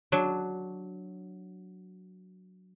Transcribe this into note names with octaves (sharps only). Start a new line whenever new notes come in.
F#3 D4